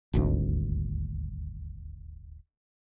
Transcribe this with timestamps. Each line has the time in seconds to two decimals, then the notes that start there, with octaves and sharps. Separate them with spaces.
0.13 D#1 G#1 D2